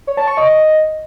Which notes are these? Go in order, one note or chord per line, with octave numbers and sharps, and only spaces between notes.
C#5
A5
C#6
D#5